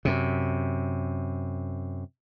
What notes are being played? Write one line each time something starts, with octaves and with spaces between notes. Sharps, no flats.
F#2 C3